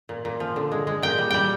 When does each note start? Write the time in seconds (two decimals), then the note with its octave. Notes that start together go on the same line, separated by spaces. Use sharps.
0.09 A#2
0.25 A#2
0.40 F3
0.56 D3
0.72 G#3
0.87 G#3
1.02 A#2 G5
1.18 G3
1.30 G3 G5